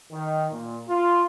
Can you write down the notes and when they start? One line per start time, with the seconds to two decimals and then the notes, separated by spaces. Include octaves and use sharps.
0.12 D#3
0.52 A#2
0.88 F4